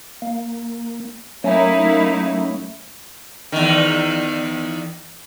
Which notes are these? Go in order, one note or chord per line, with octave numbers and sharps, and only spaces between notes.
A#3
F#3 A3 A#3 C#4 D#4 E4
E2 D#3